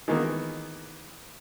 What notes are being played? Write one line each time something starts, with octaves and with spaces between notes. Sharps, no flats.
D#3 E3 G#3 A#3 B3